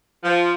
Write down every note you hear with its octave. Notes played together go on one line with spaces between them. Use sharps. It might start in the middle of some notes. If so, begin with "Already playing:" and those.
F3